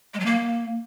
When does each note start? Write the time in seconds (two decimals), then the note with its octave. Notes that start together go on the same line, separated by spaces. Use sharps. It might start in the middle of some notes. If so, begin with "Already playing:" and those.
0.14 G#3
0.20 F#3
0.26 A#3